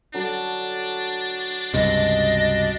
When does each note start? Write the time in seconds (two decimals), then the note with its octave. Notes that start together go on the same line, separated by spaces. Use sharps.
0.14 D3 F#3 D4 A4
1.74 C#2 G2 C3 D#5